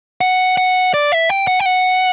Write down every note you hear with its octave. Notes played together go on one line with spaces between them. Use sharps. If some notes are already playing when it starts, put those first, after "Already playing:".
F#5
F#5
D5
E5
G5
F#5
G5
F#5